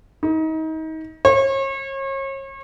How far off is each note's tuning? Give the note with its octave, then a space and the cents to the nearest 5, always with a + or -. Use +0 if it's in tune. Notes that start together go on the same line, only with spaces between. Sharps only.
D#4 +30
C#5 -35